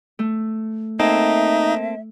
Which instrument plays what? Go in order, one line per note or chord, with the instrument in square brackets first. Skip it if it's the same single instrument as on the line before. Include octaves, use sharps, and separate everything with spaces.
[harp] A3
[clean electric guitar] A#3 C4 A4 [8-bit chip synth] D#4 [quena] E5